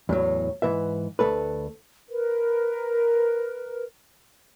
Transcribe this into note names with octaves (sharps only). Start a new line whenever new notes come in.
E2 A2 F#3
G#2 E3 B4 E5
D2 A3 A4 B4
A#4 B4